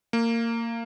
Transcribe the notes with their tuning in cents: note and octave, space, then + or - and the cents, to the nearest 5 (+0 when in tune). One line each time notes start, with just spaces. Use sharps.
A#3 -20